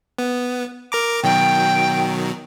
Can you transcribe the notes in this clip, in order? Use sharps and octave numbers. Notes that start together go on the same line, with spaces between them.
B3
A#4 A#5 D6
B2 D#3 F#3 G5